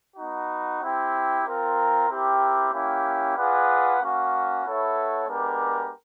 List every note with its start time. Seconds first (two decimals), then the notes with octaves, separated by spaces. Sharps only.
0.17 B3 D#4 F#4
0.81 C4 E4 G4
1.45 C4 F4 A#4
2.09 C4 E4 G4 A#4
2.72 A#3 C#4 E4 G4
3.36 F4 G#4 B4 D5 F#5
4.00 A#3 C#4 F#4
4.64 B3 E4 A4 C#5 E5
5.28 G#3 B3 D4 G4 A#4